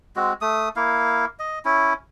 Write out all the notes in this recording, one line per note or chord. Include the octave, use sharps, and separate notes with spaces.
G#3 C4 F#4
A3 D#6
A#3 E4 F5
D#5
C#4 E4